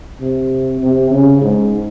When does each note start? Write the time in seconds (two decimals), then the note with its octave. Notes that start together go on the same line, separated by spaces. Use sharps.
0.20 C3
0.81 C3
1.11 C#3
1.41 G#2